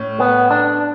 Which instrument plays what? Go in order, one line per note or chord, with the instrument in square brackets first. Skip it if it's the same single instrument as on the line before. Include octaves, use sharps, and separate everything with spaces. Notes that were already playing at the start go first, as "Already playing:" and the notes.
Already playing: [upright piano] A2 C#4
[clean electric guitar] B3
D4